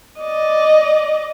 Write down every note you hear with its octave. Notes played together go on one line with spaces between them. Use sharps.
D5 D#5